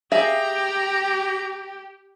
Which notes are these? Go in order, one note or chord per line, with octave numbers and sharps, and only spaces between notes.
G4 G#4 E5 F5 A#5